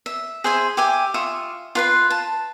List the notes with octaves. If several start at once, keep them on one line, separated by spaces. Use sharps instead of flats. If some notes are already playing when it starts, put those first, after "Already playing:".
E5
G#4 C5 E5 G#5
G4 E5 G#5
F4 E5 C#6 D#6
F4 B4 C6
A5